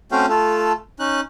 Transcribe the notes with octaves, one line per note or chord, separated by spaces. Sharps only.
A3 C4 C#4 F#4 F5 G5
A3 F4 A4
C#4 D#4 F#6